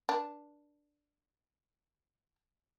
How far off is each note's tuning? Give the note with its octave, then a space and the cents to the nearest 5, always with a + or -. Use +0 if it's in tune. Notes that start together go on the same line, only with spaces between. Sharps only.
D4 +0 B4 -45